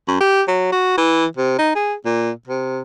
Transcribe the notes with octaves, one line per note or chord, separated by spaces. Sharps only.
F#2
G4
F#3
F#4
E3
C3
D#4
G#4
A#2
C3